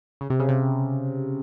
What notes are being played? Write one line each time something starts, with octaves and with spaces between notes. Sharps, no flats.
C#3
C3
C#3
C3